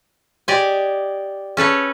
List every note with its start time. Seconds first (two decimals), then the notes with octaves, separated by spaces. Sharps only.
0.48 G4 D5 D#5 G#5
1.57 C#4 A4 B4 C#5